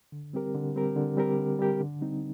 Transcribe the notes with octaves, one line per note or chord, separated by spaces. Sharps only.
D3
G3 C4 G4 A#4
D3
G3 C4 G4 A#4
D3
G3 C4 G4 A#4
D3
G3 C4 G4 A#4
D3
G3 C4 D#4